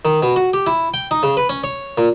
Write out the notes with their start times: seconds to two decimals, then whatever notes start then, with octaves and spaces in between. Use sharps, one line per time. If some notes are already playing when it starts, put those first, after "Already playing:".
0.05 D#3
0.22 B2
0.36 F#4
0.54 G4
0.67 E4
0.94 G5
1.11 D#4
1.23 C#3
1.37 B4
1.49 C#4
1.64 C#5
1.98 A#2